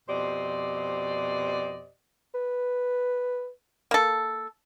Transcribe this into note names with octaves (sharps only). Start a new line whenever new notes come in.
F2 B2 G4 C5 D5 D#5
B4
A#3 A4